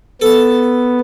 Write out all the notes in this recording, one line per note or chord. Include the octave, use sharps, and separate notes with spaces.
B3 A4 A5